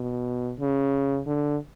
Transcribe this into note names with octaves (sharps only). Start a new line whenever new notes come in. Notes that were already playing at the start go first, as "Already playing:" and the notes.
Already playing: B2
C#3
D3